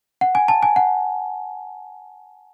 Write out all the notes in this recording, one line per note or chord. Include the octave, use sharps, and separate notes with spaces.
F#5
G#5
A5
G#5
F#5